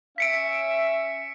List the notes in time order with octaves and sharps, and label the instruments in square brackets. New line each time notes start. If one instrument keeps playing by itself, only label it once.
[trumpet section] C#4 E5 [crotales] B6 C#7 D7